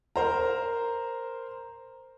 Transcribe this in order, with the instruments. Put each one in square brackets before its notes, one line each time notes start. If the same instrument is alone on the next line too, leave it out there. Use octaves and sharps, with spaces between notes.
[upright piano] A#4 C5 A#5